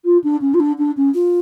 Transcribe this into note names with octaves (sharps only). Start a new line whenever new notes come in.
F4
D4
C#4
F4
D4
D4
C#4
F4